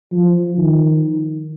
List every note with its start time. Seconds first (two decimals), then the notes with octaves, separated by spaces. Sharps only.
0.12 F3
0.58 D#3